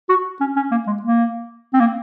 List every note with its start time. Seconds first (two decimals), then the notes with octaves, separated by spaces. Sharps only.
0.09 F#4
0.41 C#4
0.56 C#4
0.72 A#3
0.87 G#3
1.02 A#3
1.74 C4
1.80 A#3